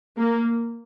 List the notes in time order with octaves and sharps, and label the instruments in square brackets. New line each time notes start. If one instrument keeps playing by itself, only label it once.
[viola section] A#3